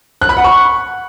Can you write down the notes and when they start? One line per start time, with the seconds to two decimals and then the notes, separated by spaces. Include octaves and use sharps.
0.21 F#6
0.29 B5
0.37 F#5
0.44 C#6